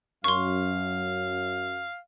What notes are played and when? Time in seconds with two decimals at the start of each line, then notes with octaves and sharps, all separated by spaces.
0.24 F#2 F5 C6 C#6